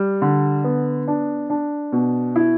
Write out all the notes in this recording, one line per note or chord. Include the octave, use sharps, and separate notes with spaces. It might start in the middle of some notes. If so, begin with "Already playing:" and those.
Already playing: G3
D3
B3
D4
D4
B2
E4